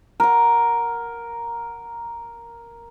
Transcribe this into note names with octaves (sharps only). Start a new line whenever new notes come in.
A#4 F#5